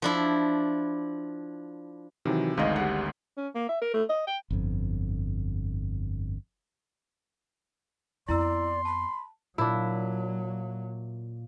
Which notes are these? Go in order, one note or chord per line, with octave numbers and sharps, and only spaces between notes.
F3 D4 E4
C3 D#3 E3 F#3
G#1 D2 G#2 D#5 F5
G3 F#5
C#4
A#3
E5
A#4
A3
D#5
G5
G1 F2
F2 B3 E4 D5 A#5 C6 E6
A5 B5
A#2 F#3 D4 E4